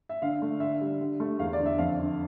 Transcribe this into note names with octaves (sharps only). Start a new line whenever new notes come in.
E5
D3 F5
A3
D3 E5
G3
D3
A3
E2 F5
D5
D3
E5
F2 F5
D3